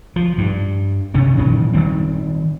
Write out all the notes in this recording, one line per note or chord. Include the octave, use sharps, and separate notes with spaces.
F3
G2
C3 D#3 C#4
A#2 D#3 E3 F#3
D#3 G3 C4